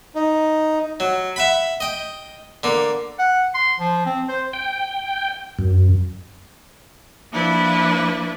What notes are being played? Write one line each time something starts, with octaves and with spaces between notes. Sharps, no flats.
D#4
F#3
E5 F#5 B5
D#5 G5
D3 A#3
F#5
C6
F3
C4
C5
G5
F#2
F3 A#3 D4 E4 B4